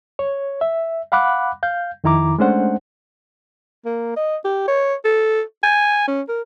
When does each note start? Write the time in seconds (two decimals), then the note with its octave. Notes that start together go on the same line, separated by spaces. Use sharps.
0.19 C#5
0.61 E5
1.12 F5 F#5 B5 D6 F#6
1.63 F5 G6
2.04 F2 D#3 E4 A#5 D6
2.38 G#3 A3 C#4 D4 C5 F#5
3.85 A#3
4.17 D#5
4.45 G4
4.68 C#5
5.05 A4
5.63 G#5
6.08 C#4
6.29 A#4